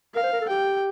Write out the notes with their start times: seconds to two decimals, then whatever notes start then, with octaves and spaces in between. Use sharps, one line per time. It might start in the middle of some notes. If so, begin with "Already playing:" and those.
0.15 A#4 F5
0.24 C5
0.33 A#4
0.41 A4
0.49 G4 G5